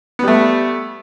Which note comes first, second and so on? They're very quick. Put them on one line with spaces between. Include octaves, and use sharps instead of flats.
B3 G3 A3